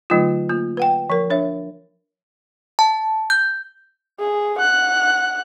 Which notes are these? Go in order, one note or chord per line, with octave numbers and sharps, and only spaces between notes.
D3 F#3 A3 D#4 F4
A#3 F4
B4 F#5 G5
F3 A#4
D4 C#5 E5
A5
G6
G#4
F#5 F#6